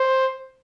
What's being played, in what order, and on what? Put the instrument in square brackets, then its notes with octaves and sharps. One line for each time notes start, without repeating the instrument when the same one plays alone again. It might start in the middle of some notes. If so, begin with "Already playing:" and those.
Already playing: [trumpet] C5